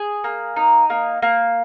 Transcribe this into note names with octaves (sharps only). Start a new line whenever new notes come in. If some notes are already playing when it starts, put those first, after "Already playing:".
Already playing: G#4
A#3
D#4
A#3
A#3